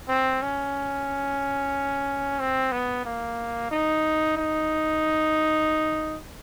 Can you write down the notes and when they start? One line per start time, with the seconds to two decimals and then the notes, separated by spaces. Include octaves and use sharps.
0.08 C4
0.42 C#4
2.40 C4
2.72 B3
3.05 A#3
3.71 D#4
4.37 D#4